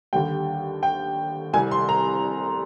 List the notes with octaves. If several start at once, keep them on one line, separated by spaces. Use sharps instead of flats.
D#2 D3 G3 G5
G5
C2 C3 G3 G#5
C6
A#5